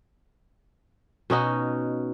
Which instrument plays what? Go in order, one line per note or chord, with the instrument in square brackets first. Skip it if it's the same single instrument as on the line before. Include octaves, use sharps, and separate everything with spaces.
[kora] B2 C#4 D#4 F#4